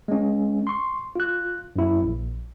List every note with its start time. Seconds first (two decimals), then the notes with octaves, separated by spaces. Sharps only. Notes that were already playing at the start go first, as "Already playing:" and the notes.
0.08 G#3 C#4
0.67 C6 C#6
1.16 F4 F#6
1.76 F#2 E4
2.01 A#1